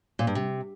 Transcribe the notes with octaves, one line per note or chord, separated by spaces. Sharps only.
A#2
G2
C3